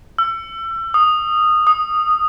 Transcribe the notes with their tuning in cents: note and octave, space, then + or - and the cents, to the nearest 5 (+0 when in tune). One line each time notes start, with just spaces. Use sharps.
E6 +30
D#6 -10
D#6 +0